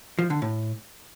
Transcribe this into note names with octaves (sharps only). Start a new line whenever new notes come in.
F3
D3
A2